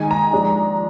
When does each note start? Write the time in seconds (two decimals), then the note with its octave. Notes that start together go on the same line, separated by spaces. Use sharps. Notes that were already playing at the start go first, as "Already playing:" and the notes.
Already playing: D#3 G#3 D#4 G#5
0.11 A#5
0.33 F3 G#3 D4